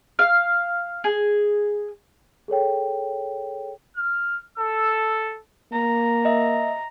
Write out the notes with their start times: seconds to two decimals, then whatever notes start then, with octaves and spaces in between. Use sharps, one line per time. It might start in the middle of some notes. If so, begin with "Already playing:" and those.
0.19 F5
1.04 G#4
2.48 G#4 A4 C#5 G5
3.97 F6
4.58 A4 E6
5.73 A#3 A#5
6.25 D#5 E5